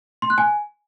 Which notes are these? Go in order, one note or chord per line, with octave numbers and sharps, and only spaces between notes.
C6
F#6
G#5